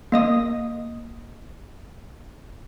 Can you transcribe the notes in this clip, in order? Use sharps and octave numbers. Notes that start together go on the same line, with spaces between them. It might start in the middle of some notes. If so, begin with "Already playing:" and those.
A#3 D#5 D#6